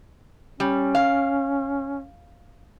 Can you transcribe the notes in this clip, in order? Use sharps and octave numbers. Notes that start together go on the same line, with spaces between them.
G3 C#4
F5